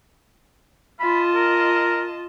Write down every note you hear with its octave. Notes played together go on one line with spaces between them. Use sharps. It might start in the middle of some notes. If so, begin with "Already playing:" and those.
F4 D#5 A5 B5
A#4